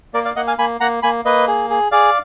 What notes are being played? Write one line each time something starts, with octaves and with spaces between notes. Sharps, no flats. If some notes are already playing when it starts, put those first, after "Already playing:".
A#3 A#4 D5
D5 F5
A#3 D#5 F#5
F5 G#5
A#3 G#5 B5
A#3 F#5 A#5
A#3 G#5 B5
A#3 B4 D#5
G#4
G#4
G#4 D5 F5